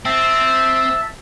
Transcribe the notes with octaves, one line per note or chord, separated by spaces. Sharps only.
C4 E5 A5